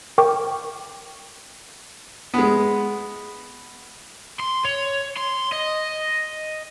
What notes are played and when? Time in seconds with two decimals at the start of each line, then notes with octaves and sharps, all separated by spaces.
0.18 A#4 G5 C#6 D6
2.34 G#3 B3
4.40 C6
4.65 C#5
5.17 C6
5.52 D#5